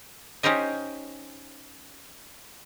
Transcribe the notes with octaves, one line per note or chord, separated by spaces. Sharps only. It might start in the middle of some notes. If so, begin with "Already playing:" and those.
C#4 D#4 G4 C5 D#5